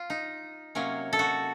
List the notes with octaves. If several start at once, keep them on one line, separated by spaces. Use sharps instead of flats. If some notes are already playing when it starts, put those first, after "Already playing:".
Already playing: F4
D#4
C3 F#3 A#3 C#4
A4
F#4